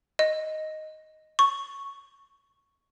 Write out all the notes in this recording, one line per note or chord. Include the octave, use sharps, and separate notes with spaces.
D#5
C#6